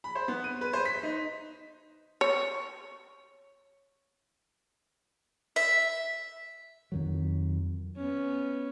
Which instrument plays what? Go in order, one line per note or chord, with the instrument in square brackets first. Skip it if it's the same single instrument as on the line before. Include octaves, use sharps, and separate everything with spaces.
[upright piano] B5
C5
B3
D#7
B4
C5
B6
D#4
[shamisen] C#5
[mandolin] E5
[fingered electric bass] F2 D#3 F#3
[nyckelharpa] B3 C#4